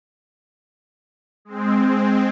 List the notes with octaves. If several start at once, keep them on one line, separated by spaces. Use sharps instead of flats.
G#3 C4